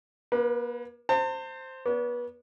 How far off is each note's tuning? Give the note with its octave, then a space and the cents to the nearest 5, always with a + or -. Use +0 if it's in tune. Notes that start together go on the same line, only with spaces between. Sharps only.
A#3 +40 B4 +0
C5 +0 A5 +45
B3 -30 D5 -45